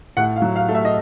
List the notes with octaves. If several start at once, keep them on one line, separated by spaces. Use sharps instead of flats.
A2 F#5
F5
F#3
F5
A3
E5
D#5